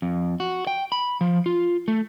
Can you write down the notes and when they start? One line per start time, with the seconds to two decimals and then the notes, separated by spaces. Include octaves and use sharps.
0.02 F2
0.40 F#4
0.67 G5
0.92 B5
1.21 F3
1.46 F4
1.88 A3